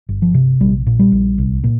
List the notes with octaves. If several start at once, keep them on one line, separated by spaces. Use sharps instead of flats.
G1
F3
C3
A#1 G3
A#2
G3
A#1
C2
A#2